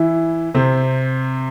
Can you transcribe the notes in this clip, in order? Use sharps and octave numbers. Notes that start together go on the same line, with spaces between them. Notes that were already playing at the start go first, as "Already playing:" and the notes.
Already playing: E3 E4
C3 C4